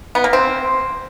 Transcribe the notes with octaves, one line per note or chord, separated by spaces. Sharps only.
B3
A#3
C4